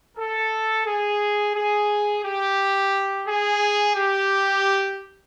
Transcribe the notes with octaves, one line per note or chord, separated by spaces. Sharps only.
A4
G#4
G#4
G4
G#4
G4